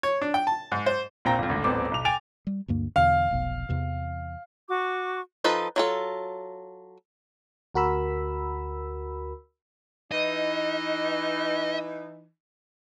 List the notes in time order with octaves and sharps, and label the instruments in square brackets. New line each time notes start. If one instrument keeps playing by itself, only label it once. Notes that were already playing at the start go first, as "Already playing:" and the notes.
[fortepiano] C#5
D4
G5
A5
G#2
C5
[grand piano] A#1 A#2 C4 G5 A#5 A#6
G1 F2
G#1 D2
D#1 A1 B3 C4 C5 D6
B1 F7
G5 G#5 A6 D7 F7
[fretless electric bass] G3
D2 G2 A#3
[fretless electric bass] E2 B2 D3 [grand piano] F5
[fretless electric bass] F1 B1 B2
E2 C3 E3
[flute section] F#4 C#6 D6
[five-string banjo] F3 D#4 A4 B4
F#3 F4 A4
[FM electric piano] D2 F#4 A#4 B5 E6
[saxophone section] E3 D#4 [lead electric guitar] D#5